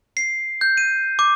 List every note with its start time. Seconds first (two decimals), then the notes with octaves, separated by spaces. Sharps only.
0.17 C7
0.61 G6
0.77 D#7
1.19 D6